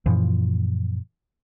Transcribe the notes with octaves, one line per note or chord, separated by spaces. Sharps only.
F#2 A#2 E3 F3